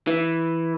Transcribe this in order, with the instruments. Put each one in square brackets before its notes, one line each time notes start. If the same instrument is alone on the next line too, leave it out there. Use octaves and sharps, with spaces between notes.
[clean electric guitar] E3